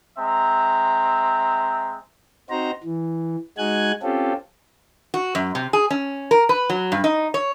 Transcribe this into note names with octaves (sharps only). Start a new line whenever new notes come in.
G#3 C4 E5 A#5
C4 D#4 F#4 C5 A#5
E3
G#3 D#4 F#4 G#5 F#6 G#6
C4 C#4 F4 G4 A4
F#4
F#2
C3
G#4
C#4
A#4
B4
F#3
G2
D#4
C#5